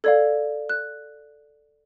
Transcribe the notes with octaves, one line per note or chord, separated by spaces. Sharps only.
A4 D5 F5 G#6
F#6